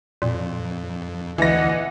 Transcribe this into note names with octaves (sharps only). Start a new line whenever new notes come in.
F2 A#2
D2 E3 D#5 F#5 A#6